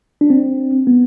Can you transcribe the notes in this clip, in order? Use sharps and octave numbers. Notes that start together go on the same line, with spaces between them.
D4
C4
B3